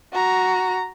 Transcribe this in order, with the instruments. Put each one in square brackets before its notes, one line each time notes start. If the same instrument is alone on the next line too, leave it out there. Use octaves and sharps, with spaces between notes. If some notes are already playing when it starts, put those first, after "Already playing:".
[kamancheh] F#4 A#5